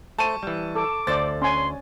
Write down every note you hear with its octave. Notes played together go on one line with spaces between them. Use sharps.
A3 C5 A5 C#6 D#7
E3 G3
A4 D6
D2 A4 C5 D5 A6
C#4 G#5 C6